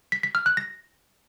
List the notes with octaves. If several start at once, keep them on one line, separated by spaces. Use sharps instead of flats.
B6
B6
F6
F#6
A#6